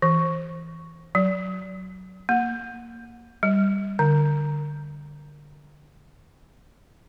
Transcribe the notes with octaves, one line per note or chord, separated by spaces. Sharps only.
E3
F#3
A#3
G3
D3